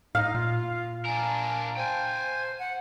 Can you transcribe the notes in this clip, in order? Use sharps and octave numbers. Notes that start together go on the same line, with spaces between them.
A2 D#4 F5
A#2 F4
D4 A#4 G#5
C5 G5 G#5
F#5